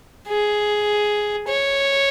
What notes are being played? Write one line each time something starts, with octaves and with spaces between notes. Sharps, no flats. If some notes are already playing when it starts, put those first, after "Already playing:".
G#4
C#5